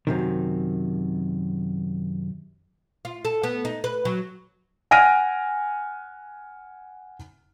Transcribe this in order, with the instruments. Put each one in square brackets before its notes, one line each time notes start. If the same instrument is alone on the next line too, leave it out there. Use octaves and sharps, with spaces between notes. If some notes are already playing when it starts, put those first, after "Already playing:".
[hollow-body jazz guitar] F#2 C3 D#3
[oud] F4
A4
B3
D#4
B4
F#3
[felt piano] F#5 G#5 F6 A#6 D7 D#7